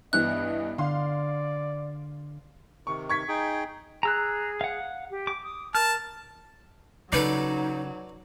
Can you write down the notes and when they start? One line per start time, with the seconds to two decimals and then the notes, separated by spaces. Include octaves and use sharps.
0.13 G2 E3 B3 D#5 F#6
0.78 D3 D5 F5 C6
2.87 C3 D#3 C#6
3.09 C#6 G#6 B6
3.28 D#4 G#4 G5
4.03 G#4 A#5 E6 F#6
4.61 F5 F#5
5.10 G4
5.27 D6
5.44 D#6
5.75 A#4 A5 F6
7.13 C#3 F#3 C#4 D#4 A4 B4 D5